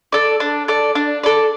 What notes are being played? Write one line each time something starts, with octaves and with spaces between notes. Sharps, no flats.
A4 D5
D4
A4 D5
D4
A4 D5